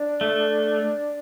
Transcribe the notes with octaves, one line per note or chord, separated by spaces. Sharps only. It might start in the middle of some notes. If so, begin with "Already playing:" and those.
Already playing: D4
A3